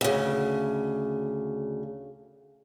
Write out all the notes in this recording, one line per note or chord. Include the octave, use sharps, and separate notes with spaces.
D2 C#3